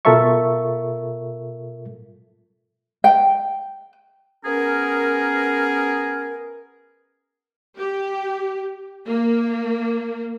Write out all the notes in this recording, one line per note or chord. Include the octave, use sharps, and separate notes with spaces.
B2 F4 A4 A#4 E5 C#6
G5
B3 C#4 G#4 A#4
G4
A#3